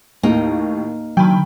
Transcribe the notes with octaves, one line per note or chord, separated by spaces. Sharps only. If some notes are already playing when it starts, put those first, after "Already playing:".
D#2 A2 A#3 D#4
D3 D#3 F#3 G5 B5